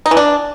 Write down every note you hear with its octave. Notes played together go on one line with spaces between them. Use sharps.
D#4
E3
D4